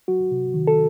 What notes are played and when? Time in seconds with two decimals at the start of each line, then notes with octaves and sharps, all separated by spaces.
0.08 F#3 F#4
0.31 C3
0.54 D#3
0.67 A4